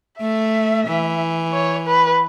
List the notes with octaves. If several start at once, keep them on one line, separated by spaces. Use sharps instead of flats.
A3 E5
E3
C#5
B4